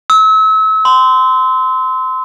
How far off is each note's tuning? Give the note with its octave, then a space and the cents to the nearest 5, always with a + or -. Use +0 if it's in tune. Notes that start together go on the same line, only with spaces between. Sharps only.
E6 -35
C6 -25